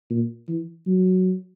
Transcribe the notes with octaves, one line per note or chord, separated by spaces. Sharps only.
A#2
E3
F#3